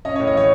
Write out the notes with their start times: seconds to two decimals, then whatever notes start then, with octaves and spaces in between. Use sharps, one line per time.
0.05 C#4 D#5
0.16 C#5
0.20 A2
0.27 D#5
0.35 E3 C#5